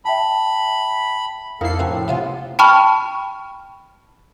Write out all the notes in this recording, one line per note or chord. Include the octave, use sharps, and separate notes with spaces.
E5 G5 A5 B5
F2 A#3 D#4 E4 A4 A#4 F5 C7
A2 C4 C#4 F#4
C3 A#3 B3 F4 G#5
G5 A5 B5 C#6 F6